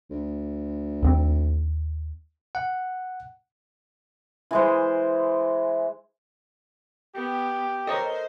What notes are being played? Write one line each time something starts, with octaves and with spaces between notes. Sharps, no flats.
D2
D#2 B3 C4
F#5
E3 G#3 C5
B3 G4
A4 A#4 C5 C#5 D#5 A#5